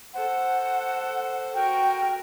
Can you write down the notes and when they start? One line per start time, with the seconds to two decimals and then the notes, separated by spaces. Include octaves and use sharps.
0.14 A4 C5 F#5
1.54 F#4 A#4 G5